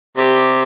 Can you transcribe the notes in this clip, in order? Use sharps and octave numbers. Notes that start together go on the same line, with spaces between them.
C3 G4